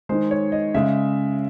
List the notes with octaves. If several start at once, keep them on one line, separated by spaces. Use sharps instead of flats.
D#3 G#3 C5
C#5
D#5
C#3 G#3 E5